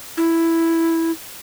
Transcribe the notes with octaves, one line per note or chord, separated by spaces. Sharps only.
E4